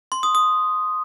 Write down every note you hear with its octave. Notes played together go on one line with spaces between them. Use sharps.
C6
D#6
D#6